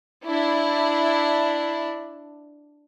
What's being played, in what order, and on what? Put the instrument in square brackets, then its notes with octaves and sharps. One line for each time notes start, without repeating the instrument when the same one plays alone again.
[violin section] D4 E4